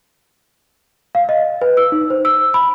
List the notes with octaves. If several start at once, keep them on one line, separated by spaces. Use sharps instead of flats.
F5
D#5
B4
E6
D#4
C5
E6
B5